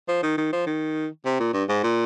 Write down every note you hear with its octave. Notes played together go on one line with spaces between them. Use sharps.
F3
D#3
D#3
F3
D#3
C3
A#2
G2
G#2
A#2